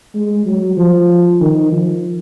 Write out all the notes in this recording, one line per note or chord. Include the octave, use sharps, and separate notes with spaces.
G#3
F#3
F3
D#3
F3